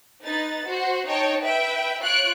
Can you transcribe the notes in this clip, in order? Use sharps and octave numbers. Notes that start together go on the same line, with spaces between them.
D#4 B4 A6
F#4 C5
D#4 C#5 G5 A5
B4 E5 G5
F4 C#5 F#6 D7